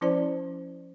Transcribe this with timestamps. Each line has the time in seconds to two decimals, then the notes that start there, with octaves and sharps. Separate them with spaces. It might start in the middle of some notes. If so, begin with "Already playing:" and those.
0.01 F3 C#4 E4 C5 D5 A5